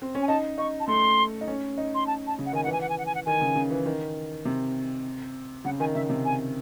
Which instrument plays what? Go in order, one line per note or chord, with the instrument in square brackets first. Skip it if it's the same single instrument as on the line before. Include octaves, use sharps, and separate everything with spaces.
[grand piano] C4
C#4
[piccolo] G#5
[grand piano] D#4 [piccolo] A5
[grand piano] D#4 [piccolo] C#6
[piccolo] A5
[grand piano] A3 [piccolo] C6
[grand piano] D#4
C#4
D#4
[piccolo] C6
A5
A5
[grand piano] C#3
[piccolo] F#5
[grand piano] D#3 [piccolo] G#5
[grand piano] E3 [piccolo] F#5
[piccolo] G#5
F#5
G#5
F#5
G#5
F#5
[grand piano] D#3 [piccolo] G#5
[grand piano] C#3
C#3
E3
D#3
C3
[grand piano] C#3 [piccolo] F#5
[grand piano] D#3 [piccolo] G#5
[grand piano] C#3 [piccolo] E5
[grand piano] C3
[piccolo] G#5